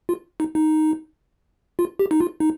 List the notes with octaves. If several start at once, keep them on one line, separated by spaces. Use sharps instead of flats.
F4
D#4
D#4
F4
G4
D#4
F4
D#4